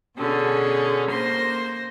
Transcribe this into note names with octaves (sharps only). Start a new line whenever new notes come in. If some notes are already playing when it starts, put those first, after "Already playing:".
B2 D3 C#4 G#4
A#3 C5 C6 A#6